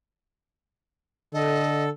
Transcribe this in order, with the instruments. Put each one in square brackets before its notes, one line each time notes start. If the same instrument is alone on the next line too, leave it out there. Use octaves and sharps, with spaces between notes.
[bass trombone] D3 [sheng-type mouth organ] A4 [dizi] D#5